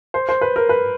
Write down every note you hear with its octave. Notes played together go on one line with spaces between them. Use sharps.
C5
C5
B4
A#4
B4